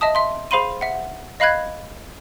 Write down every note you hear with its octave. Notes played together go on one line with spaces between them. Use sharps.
D#5 E5 A5 D#6
E5 C6
G#4 C5 F5 B5 C6 D#7
E5 F#5
D#5 F5 B5 F#6 G#6